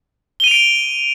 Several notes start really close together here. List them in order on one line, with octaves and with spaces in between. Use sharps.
G7 D#7 F7 D7